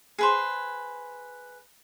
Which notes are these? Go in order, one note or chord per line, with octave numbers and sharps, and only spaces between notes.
G#4 B4 C5